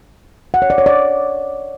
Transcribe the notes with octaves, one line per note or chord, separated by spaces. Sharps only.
F#5
C#5
D5
C#5
D5